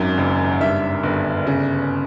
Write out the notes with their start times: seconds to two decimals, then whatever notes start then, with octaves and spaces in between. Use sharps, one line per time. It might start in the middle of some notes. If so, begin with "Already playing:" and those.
Already playing: G#1 F#2
0.18 F#1
0.61 G2 E5
1.03 G1
1.47 C#3